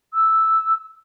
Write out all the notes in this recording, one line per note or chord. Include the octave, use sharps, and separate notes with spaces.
E6